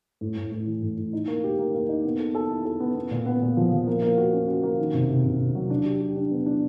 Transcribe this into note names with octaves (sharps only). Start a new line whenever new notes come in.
A2
A2
A2
E3
A2
A2
D#4
A#3
G4
A#3
A#3
D#4
B3
A4
A4
E4
A4
B3
B3
A#2
B3
A#2
F3
F3
A#3
A#3
F#4
C#4
F#4
A#3
D#3
C3
C3
C3
C3
F#3
D4
G4
G4
D4
B3
D4